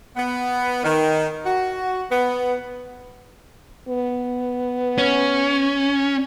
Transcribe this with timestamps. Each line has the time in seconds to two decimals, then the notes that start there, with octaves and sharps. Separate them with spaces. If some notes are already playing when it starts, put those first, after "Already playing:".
0.16 B3
0.84 D#3
1.45 F#4
2.10 B3
3.88 B3
4.98 C#4